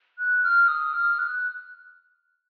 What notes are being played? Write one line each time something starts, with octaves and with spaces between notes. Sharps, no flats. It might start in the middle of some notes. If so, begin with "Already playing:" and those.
F#6
F6
D#6
F6
F#6